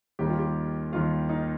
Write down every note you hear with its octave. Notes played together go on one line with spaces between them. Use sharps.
D#2 D#3 G3 G4
F4
G4
D#2 D#3 G3 F4
D#4